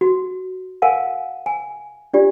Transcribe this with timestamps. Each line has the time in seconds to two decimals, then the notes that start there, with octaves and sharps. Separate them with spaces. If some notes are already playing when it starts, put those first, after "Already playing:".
0.01 F#4
0.82 A#4 F5 F#5 G#5 A5
1.46 G#5
2.14 D4 F4 G4 D5